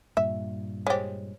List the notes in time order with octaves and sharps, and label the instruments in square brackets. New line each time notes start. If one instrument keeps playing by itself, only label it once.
[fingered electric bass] G2 A#2 [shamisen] E5
[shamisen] G#3 G4 [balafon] C5 C#5